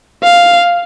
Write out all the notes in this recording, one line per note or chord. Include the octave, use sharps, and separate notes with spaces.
F5